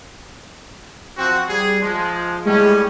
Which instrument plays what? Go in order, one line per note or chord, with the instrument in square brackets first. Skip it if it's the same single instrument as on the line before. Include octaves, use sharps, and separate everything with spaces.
[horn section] F3 C4 F#4
G3 G#4
F3 G#3
[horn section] A2 G3 C#4 [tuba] G#3